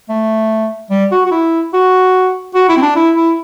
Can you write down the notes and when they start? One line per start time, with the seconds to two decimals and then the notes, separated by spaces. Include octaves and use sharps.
0.09 A3
0.90 G3
1.12 F#4
1.26 F#4
1.31 E4
1.74 F#4
2.55 F#4
2.69 E4
2.77 C4
2.82 D4
2.96 E4
3.16 E4